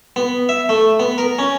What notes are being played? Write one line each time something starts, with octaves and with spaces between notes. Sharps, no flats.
B3
E5
A3
B3
A#4
C#4